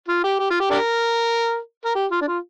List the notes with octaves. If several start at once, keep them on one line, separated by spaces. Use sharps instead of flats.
F4
G4
G4
F4
G4
D4 G4 A#4
A#4
G4
F4
D4
F4